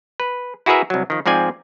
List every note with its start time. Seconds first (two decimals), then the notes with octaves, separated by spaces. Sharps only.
0.20 B4
0.66 E4 F#4 G#4 A#4 B4 E5
0.90 C2 F#3
1.10 D#3 F3
1.26 G#2 F3 C4 D5 G#5